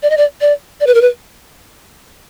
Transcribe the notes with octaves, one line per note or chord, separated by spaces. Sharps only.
D5
D#5
D5
D5
D5
B4
A#4
B4